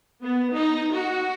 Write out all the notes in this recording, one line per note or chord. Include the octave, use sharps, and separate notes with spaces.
B3
D#4
F#4